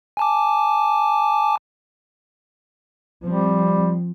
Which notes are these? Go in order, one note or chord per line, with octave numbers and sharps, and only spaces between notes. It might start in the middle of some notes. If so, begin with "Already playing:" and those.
G#5 A5 D6
F3 G3 C4